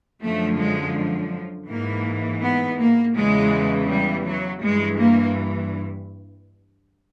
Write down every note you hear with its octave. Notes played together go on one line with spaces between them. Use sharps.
F#2 D3 F3 A3
G#3
G#2 E3 A#3
B3
A#3
E2 C#3 E3 G#3
G3
F#3
G2 E3 G#3
A#3